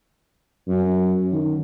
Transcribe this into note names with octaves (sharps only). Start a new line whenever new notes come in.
F#2
D#3